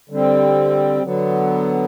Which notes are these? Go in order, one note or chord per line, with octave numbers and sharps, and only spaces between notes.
D3 G3 C4
D3 F#3 B3